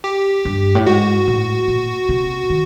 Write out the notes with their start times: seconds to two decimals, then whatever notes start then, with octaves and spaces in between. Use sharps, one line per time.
0.04 G4
0.45 G2
0.75 A2
0.86 G#2 F#4
1.28 A2
1.68 A#2
2.09 C3
2.50 D#3